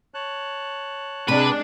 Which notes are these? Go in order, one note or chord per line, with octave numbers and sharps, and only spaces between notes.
C#5 A5 F#6
C3 G#3 D4 B4